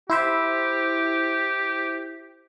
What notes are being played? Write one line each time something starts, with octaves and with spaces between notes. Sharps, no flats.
E4 G4 C5 E5